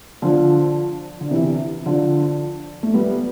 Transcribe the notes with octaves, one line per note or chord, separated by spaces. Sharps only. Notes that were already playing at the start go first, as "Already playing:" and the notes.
D3 F3
D3
C3 E3
D3 F3
A3
G3 B3